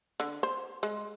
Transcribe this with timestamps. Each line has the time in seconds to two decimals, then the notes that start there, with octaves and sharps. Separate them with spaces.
0.20 D3
0.43 C5
0.83 G#3